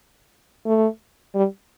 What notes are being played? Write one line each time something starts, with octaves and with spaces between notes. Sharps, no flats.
A3
G3